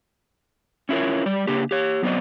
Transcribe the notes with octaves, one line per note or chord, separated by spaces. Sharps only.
C#4 E4 F4 A#4 C#5
G3 D5
C#3 A#3 D4 G4
G4 C#5
F#3 B3 C4 A4 D5 D#5